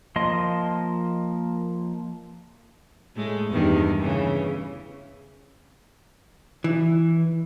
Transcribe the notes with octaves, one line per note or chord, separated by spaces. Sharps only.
F3 A#3 D#5 C6
A2 G#3 A3
E2 G2 D#3
C#3 E3
E3